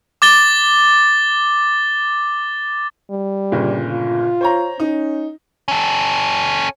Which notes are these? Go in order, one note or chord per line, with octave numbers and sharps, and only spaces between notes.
D6 A6 G7
G3
G1 A#2 C#3
F4
C5 C#5 A#5
C#4 D#4
C#4 A4